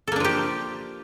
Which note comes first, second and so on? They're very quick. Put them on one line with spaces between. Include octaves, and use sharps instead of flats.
A4 A#3 D4 F3 G4